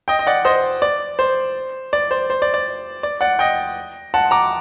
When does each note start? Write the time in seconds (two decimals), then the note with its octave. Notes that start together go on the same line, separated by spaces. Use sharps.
0.08 D#5 G5
0.19 D#5
0.27 D5 F#5
0.45 C5 D#5
0.82 D5
1.19 C5
1.93 D5
2.11 C5
2.30 C5
2.42 D5
2.54 D5
3.03 D5
3.21 D5 F#5
3.39 D#5 G5
4.14 F#5 A5
4.31 A#5 D6